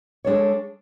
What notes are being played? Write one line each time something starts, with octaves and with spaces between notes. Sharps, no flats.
G#3 D4 A4 C#5